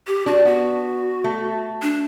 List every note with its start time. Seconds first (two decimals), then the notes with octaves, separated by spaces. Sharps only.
0.07 G4
0.26 D4 F#4
0.45 B3 F#4
1.24 A3
1.82 D4